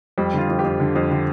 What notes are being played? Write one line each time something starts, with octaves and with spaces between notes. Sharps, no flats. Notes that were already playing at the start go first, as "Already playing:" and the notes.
F2 G3
D3 F4
F2
G4
F2
D3
F2
D3